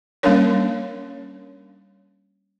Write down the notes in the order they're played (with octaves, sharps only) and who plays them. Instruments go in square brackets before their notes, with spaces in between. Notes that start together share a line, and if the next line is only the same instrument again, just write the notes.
[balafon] G3 A#3 C#4 D4 A#4 C#5